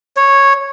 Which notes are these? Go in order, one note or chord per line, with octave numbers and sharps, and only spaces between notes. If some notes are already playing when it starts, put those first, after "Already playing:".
C#5